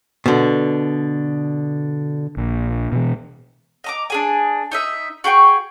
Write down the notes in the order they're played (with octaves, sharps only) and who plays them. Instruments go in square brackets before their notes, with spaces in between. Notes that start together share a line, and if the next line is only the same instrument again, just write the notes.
[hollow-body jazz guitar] B2 D3
[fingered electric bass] A#1
B2 E3
[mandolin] D#5 A#5 D6
D4 G#4 G#5
D#4 D#5 E5
F#4 G#4 G5 C#6